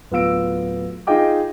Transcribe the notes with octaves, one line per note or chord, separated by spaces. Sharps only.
D1 B3 F4 F5 E6 D7
D#4 F4 G#4 D#5 G5 D6